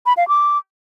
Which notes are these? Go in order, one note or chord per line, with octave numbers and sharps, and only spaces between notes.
B5
F5
D6